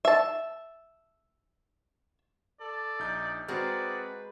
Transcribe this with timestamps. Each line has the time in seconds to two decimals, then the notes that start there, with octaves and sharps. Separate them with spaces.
0.05 E5 A5
2.60 A4 D5
2.99 A#1 D#4 G6
3.48 G#3 C4 F#4 G#4 A#4 B4 D5